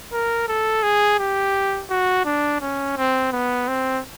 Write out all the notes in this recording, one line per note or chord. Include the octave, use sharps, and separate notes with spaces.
A#4
A4
G#4
G4
F#4
D4
C#4
C4
B3
C4